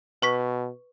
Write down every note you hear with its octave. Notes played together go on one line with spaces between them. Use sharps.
B2 B4 C#6 B6